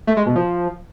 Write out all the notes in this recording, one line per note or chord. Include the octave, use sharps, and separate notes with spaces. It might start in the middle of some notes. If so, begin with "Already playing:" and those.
A3
G#3
B2
F3